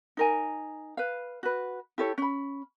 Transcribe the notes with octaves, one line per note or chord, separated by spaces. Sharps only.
D#4 A#4 G#5
B4 F5
F#4 B4
E4 G4 A4 C#5
C#4 B5